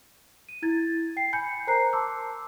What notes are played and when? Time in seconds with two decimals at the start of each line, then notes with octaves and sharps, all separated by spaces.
0.49 D#7
0.62 E4 G#6 A6
1.17 G5 C7
1.33 G#5 B5 G6 C#7
1.67 A#4 C5 A#5 F#6 C7
1.93 A5 C6 D6 E6